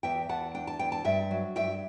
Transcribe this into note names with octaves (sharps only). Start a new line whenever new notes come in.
E2 E5 G5
E2 F#5 A5
D4 G5
A5
E2 G5
A5
G2 E5 G5
F#3
G2 E5 G5